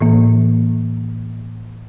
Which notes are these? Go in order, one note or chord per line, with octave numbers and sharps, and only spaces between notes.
A2 E3 A#3